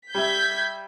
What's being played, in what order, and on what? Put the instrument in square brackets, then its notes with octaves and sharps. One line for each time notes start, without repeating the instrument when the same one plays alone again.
[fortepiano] G3 E5 [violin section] G6 G#6 B6